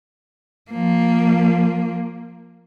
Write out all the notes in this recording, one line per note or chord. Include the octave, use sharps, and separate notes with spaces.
F3 A#3